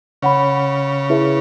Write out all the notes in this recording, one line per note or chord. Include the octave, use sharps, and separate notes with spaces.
C#3 C#5 F#5 B5
E4 G#4 B4 E5